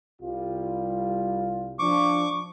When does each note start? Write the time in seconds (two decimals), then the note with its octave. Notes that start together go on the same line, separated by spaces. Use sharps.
0.21 C2 G3 F4
1.79 F3 D4 C#6 D6